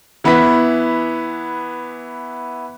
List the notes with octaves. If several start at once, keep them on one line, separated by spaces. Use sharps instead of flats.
E3 B3 E4 B5 B6